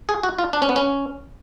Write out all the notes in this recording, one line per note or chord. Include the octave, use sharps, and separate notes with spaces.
G#4
F#4
F4
D4
C#4
B3
C#4